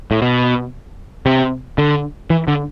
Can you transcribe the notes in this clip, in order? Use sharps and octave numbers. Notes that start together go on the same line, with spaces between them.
A2
B2
C3
D3
E3
D3